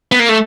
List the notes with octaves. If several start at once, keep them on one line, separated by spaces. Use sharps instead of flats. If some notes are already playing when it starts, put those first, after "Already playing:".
B3
A#3
A3